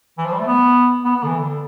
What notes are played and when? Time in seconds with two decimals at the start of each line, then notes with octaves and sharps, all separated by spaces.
0.18 E3
0.25 F3
0.32 G3
0.40 A3
0.46 B3
1.04 B3
1.16 B3
1.23 D3
1.27 E3
1.38 D3